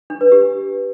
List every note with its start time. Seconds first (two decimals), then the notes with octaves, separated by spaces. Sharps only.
0.10 D4
0.21 B4
0.32 G4